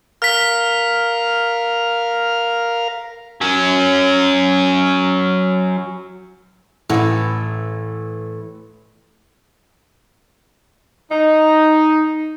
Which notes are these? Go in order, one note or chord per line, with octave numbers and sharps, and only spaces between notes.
A#4 F5 F6 B6
F#3 C#4
A1 A2 E3 A3 F#5
D#4